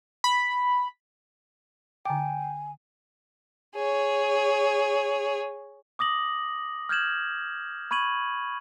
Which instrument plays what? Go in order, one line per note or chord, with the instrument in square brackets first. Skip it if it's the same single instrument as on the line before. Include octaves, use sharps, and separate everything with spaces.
[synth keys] B5
[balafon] D3 D6 [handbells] G5 [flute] G#5
[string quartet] G#4 C#5
[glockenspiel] D6 D#6 A#6 F#7
F6 G6 G#6 E7 F#7
B5 C#6 G#6 D#7 F#7